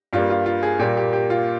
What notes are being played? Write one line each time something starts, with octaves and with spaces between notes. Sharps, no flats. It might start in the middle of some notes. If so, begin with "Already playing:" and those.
G2 G3 A#3 F4
F4
F4
G#4
A#2 G3 A#3 G4
G4
G4
F4